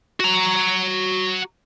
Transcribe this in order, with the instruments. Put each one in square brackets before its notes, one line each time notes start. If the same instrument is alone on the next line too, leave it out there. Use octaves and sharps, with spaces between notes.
[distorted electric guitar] F#4 A#5